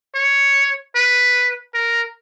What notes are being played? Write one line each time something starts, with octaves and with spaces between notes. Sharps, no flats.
C#5
B4
A#4